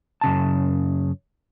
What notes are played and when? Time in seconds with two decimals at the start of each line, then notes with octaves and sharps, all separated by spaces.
0.21 F#2 C#3 A5